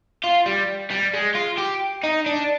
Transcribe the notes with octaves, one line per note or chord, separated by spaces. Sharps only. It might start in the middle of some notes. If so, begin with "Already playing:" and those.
F4
G3
G3
G#3
F4
G4
D#4
D4